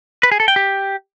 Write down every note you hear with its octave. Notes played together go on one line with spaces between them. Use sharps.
B4
G#4
A4
G5
G4